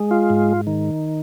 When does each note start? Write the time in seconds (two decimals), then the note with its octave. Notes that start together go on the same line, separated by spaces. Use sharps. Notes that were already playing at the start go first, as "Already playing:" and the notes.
Already playing: G#3
0.11 F4
0.30 G#2
0.67 D#3